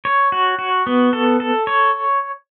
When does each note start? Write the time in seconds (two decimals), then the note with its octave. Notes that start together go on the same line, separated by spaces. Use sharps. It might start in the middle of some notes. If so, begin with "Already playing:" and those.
0.05 C#5
0.32 F#4
0.59 F#4
0.87 B3
1.13 A4
1.40 A4
1.67 C#5